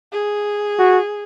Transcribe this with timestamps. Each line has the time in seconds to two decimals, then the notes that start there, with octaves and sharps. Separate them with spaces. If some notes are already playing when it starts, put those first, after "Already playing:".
0.12 G#4
0.79 F#4